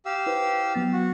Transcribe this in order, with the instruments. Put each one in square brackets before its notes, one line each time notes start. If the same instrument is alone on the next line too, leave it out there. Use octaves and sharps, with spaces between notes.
[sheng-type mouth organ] G4 F5 E6
[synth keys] E4 B4 C5
F#3 B3 A6
[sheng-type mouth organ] F#4